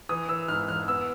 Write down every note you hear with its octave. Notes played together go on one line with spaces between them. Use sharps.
E3 D#6
E3 E6
G#2 F6
E3 F6
B3 E6